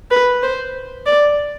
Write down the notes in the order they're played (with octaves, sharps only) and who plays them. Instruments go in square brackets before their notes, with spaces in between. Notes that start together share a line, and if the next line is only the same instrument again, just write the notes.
[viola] B4
C5
D5